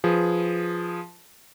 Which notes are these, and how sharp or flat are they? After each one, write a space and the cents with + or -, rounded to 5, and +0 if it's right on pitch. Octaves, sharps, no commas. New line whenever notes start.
F3 +0 G#4 +0 B4 +0